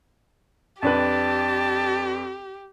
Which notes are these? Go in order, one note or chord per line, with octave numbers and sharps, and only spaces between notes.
F2 D4 G4 B4 A5